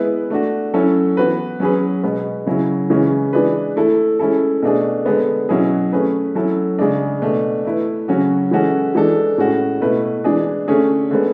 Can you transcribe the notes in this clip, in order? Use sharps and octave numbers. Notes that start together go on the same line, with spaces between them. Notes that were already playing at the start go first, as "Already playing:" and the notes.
Already playing: G#3 B3 E4 B4
A3 D4 F#4
F#3 C#4 E4 A4
E3 B3 F#4 B4
F#3 C#4 G#4 B4
B2 G#3 B3
C#3 F#3 C#4 E4
C#3 E3 G#3 C#4
E3 G#3 D4 G#4 B4
A3 E4 A4
G#3 C#4 E4 A4
B2 A3 D4 G#4
D3 G#3 B3
B2 F#3 C#4 E4 G#4
A3 C#4 G#4 B4
F#3 C#4 E4 A4
C#3 G#3 D4
B2 A3 D4
A3 E4 B4
C#3 F#3 C#4 F#4
E3 G#3 C#4 F#4 A4
E3 G#3 D4 A4
A2 G#3 C#4 F#4
B2 A3 E4 B4
E3 G#3 D4 G#4
D3 A3 C#4 G#4
D3 G#3 B3